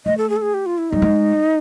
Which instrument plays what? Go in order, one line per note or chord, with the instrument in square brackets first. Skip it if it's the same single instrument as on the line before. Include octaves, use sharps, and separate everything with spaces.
[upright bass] A3 [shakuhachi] D#5
[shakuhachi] A4
G#4
A4
G#4
G4
F4
E4
[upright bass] G3 [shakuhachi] D#4
[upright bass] G#3